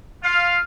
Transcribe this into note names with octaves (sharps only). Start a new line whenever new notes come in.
F4 F5